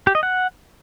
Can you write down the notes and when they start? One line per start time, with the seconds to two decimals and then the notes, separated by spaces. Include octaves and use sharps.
0.07 G4
0.15 D#5
0.23 F#5